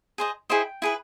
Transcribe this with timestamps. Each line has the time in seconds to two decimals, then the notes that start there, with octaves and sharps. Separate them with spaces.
0.18 G#4 C5 D#5
0.50 E4 G#4 C5 D#5 G5
0.82 E4 G#4 B4